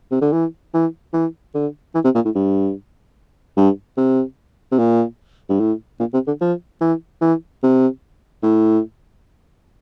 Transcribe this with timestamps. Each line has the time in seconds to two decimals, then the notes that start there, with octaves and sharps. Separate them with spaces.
0.11 C3
0.21 D3
0.33 E3
0.74 E3
1.13 E3
1.54 D3
1.94 E3
2.04 C3
2.15 A#2
2.25 A2
2.35 G2
3.57 G2
3.97 C3
4.72 C3
4.79 A#2
5.49 G2
5.60 A2
6.00 A#2
6.14 C3
6.27 D3
6.41 F3
6.81 E3
7.21 E3
7.63 C3
8.43 A2